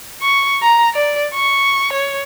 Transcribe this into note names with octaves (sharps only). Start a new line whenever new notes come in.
C#6
A#5
D5
C#6
C#5